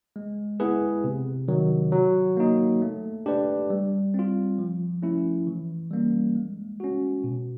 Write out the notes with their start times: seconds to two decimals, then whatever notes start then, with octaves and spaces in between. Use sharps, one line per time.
0.16 G#3
0.60 B3 E4 G#4 B4
1.04 C3
1.48 D#3 F#3
1.92 F#3
2.37 A#3 D#4
2.82 A3
3.26 D4 G4 B4 D5
3.70 G3
4.14 C4 F4
4.58 F3
5.03 A3 C#4 E4
5.47 E3
5.91 G3 A#3 C#4
6.36 G#3
6.80 C#4 F#4
7.24 B2